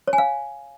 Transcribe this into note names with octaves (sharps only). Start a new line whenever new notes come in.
C#5
G#5
F5